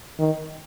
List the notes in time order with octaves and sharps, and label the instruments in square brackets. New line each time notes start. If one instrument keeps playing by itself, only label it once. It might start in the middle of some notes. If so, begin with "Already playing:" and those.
[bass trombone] D#3